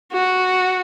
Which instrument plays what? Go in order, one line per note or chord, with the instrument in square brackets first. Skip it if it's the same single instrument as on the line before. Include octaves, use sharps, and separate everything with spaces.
[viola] F#4